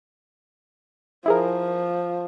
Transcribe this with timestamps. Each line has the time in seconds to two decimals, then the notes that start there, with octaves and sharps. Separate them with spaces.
1.26 F3 E4 G#4 A#4